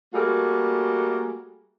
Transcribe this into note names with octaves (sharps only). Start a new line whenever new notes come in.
G3 A3 A#3 F#4 G#4